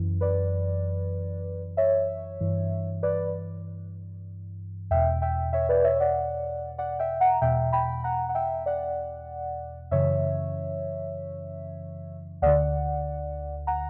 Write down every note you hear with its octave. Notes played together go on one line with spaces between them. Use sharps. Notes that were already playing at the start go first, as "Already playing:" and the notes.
Already playing: F#2 E3
B4 D5
C#5 E5
G2 E3
B4 D5
E2 B2 E5 G5
E5 G5
C#5 E5
B4 D5
C#5 E5
D5 F#5
D5 F#5
E5 G5
F#5 A#5
E2 B2 E5 G5
G5 B5
F#5 A#5
F#5
E5 G5
D5 F#5
F#2 C#3 E3 C#5 E5
D2 D3 D5 F#5
F#5 A#5